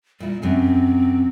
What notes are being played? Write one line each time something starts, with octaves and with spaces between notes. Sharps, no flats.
A#2 G3 E4
F#2 C3 C4 G#4